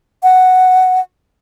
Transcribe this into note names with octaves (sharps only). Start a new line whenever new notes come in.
F#5